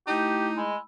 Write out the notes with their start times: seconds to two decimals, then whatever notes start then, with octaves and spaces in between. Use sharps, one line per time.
0.07 A3 D#4 E4 G4
0.57 G#3 B5 E6